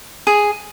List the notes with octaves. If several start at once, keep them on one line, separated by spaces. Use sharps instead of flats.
G#4